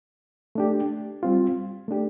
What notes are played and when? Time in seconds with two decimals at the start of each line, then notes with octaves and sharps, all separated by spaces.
0.55 A3 D4 G4
1.23 G3 C4 F4
1.88 A3 D4 G4